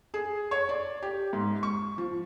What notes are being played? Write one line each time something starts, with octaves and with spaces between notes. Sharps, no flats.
G#4
C#5
D5
G4
G#2
C#6
F3